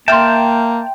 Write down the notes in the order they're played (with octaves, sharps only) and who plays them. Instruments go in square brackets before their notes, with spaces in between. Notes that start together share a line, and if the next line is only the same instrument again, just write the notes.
[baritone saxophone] A#3 [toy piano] E5 C6 [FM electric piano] G5 [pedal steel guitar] A5 F6